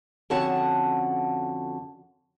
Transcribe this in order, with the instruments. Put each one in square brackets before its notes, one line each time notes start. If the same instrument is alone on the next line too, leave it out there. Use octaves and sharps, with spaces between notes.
[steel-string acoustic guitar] F2 D3 C#4 F#4 F#5 A5